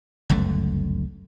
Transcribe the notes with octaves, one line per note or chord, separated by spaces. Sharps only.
G1 C#2 F#2 A3